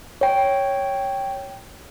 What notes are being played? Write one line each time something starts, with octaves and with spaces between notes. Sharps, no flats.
C#5 G5